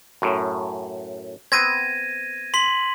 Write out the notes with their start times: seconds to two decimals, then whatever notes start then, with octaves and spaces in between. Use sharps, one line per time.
0.22 F#2 A2
1.52 B3 C4 G#6 A#6 D#7
2.54 C6 B6 F#7